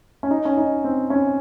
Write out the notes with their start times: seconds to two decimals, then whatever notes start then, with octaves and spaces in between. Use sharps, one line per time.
0.23 C#4
0.31 D#4
0.45 C#4
0.57 D#4
0.84 C4
1.10 C#4